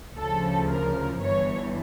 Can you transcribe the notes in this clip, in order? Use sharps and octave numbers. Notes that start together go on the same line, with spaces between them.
D2 C#3 F3 A4
A#4
G1 G2 E3 C#5